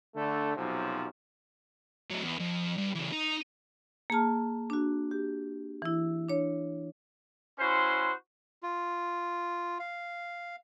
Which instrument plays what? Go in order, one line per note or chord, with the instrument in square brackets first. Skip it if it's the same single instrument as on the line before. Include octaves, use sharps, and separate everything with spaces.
[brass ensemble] D3 A3
B1 F#2 C3 F3
[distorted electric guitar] F#3 A3
E2
F2
G2
C#3 E3
D#4
[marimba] A#3 G#4 A5 F6
D4 F#4
G4
E3 E4
D4 C#5
[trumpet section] C#4 E4 F#4 C5 C6
[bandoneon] F4
F5